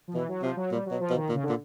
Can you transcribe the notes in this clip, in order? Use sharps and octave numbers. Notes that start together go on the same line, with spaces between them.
F3
B2 E3
F#3
C3 F3
F#3
A#2 G3
B2 F#3
F3
B2
D#3
A#2
C#3
D3
A#2